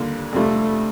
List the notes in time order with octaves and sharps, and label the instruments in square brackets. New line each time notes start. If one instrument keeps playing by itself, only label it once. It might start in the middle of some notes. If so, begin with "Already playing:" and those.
Already playing: [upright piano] D#2 D3 G3 A#3 F4
[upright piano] F2 C3 G3 D4 F4 [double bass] A3